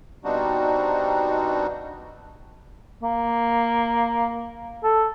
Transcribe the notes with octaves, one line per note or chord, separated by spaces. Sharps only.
B2 G3 C4 D4 D#4 F#4
A#3
A4